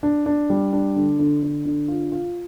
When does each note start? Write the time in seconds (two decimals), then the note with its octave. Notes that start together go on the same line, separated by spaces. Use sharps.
0.03 D4
0.26 D4
0.50 G3
0.73 D4
0.96 D3
1.19 D3
1.42 D3
1.65 D3
1.88 F4
2.12 F4